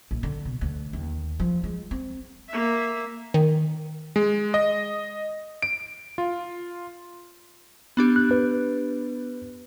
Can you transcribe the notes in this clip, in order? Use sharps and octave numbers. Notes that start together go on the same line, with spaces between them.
A#1
D3
B2
D2
D#2
F3
G#3
C4
A#3 E5
D#3
G#3
D#5
D7
F4
B3 D4 G4
F#6
B4